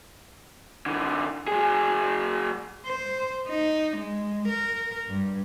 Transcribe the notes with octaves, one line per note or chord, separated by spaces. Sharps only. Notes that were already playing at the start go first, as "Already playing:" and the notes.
D3 E3
F#3 G#4
C5
D#4
G#3
A#4
G2